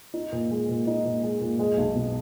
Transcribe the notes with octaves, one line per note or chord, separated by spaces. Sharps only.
D#4
A#2
G#3
A#2
D#4
A#2
G#3
A#2
G#3
B1
B2